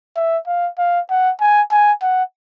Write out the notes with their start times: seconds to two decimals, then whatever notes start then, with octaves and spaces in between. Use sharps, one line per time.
0.16 E5
0.47 F5
0.78 F5
1.10 F#5
1.40 G#5
1.71 G#5
2.02 F#5